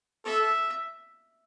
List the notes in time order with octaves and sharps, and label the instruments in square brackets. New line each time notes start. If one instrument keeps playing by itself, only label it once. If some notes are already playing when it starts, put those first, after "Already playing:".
[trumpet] A4 [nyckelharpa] E5